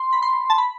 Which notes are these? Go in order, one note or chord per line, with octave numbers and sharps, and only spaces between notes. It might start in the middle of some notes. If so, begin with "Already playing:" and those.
Already playing: C6
B5
C6
A5
B5